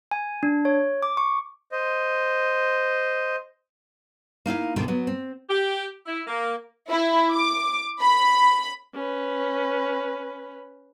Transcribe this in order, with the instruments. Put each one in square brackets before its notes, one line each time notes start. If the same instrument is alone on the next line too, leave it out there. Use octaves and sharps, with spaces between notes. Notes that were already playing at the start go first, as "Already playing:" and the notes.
[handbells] G#5
D4
C#5
D6
C#6
[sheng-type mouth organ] C5 D#5
[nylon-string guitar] A#3 D#4 E4 F5
D2 B2 D3 D#3
F#3 B3
C4
[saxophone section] G4
E4
A#3
[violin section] E4
D6
B5
[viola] C#4 B4